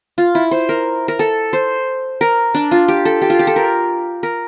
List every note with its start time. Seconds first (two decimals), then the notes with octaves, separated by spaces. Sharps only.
0.18 F4
0.35 E4
0.51 C5
0.69 A#4
1.08 A#4
1.19 A4
1.53 C5
2.21 A#4
2.54 D4
2.71 F4
2.88 G4
3.05 A4
3.22 G4
3.30 F4
3.39 G4
3.47 A4
3.56 A#4
4.23 A#4